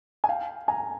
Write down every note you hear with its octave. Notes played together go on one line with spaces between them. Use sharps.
G#5
F5 G5
G#5 A#5